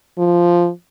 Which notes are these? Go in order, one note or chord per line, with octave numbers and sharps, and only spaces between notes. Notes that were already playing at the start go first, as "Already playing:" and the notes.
F3